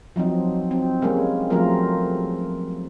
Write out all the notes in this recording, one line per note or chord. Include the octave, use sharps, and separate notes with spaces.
F3 F#3 C4 D#4
C4
G3 G#3 A#3 C#4
F3 F#3 A3 C4 F4 A#4